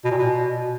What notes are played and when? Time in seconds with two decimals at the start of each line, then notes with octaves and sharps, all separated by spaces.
0.05 B2
0.11 A#2
0.17 B2